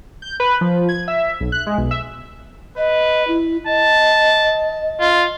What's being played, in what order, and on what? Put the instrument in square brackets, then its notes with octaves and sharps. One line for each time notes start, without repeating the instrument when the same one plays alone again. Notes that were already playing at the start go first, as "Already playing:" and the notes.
[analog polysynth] G6
B4
F3
G#6
E5
B1
F#6
G#3
B1
E5
[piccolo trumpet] B4 [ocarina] D#5
[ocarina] E4
[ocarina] D#5 [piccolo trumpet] A5
[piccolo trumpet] F4